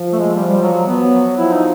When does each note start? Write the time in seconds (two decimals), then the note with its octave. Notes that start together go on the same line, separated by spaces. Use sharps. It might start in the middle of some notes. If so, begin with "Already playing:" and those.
Already playing: F3
0.13 A3
0.19 G#3
0.35 G3
0.48 G3
0.62 F#3
0.73 F#3
0.87 F#3 B3
1.37 F3 E4
1.51 D#4